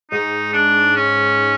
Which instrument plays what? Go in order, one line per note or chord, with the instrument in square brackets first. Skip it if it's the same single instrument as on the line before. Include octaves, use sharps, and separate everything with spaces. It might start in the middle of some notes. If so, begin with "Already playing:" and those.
[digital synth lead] G#2 [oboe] D#4
[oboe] D4
C#4